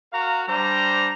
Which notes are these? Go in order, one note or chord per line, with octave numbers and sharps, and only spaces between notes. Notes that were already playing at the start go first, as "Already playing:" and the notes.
F#4 A#4 F5 A#5
G3 D4 C5 A#5